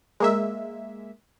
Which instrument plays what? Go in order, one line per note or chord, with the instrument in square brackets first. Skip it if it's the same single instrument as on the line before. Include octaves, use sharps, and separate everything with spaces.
[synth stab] G#3 A#3 E5